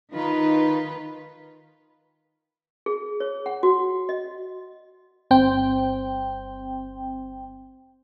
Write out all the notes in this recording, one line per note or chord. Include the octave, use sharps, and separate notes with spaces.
D#3 D#4 F4 B4
G#4
C#5
F#5
F#4
D#5
G1 C4 G5